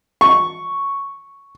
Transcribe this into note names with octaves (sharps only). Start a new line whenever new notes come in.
C#6